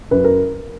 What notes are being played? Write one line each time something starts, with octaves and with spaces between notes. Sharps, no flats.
F#2 B4
A#4